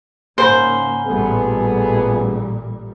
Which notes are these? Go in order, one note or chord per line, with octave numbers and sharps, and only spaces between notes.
G#2 C#3 A#3 C5 F#5 G#5 B5
A1 A#2 G3 A3 B3 G#4